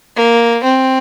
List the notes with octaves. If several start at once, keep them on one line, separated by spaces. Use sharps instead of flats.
A#3
C4